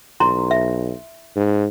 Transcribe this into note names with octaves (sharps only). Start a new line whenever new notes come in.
B1 E4 A#5 C6
E5
G#2